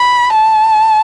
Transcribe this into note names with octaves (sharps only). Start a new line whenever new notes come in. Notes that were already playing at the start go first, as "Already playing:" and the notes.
Already playing: B5
A5